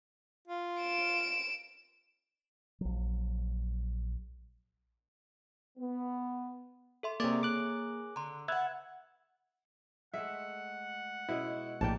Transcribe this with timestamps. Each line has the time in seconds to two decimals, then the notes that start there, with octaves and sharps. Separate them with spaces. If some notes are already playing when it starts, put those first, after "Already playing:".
0.48 F4
0.81 D7 E7
2.81 A#1 F#3
5.78 B3
7.03 A4 E5 C6
7.20 C3 A#3 G#4 A#4 C#5 D5
7.43 D6 F#6
8.16 D3 A#5 C6
8.48 B3 E5 F#5 E6 F#6 G#6
10.14 G#3 A3 E5 F#5
11.29 B2 G#3 C#4 E4
11.81 A#1 A2 A#3 B4 D5 G5 A5